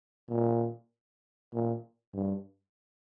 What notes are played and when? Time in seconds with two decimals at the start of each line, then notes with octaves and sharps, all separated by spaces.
0.29 A#2
1.53 A#2
2.14 G2